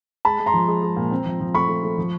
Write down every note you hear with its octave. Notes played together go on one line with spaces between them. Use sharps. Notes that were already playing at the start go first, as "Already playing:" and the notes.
G#3 A5 B5
G#3
A#5 C6
F3
G#3
G#3
A#2
C4
F3
F3
A3 B5 C#6
A3
A3
F3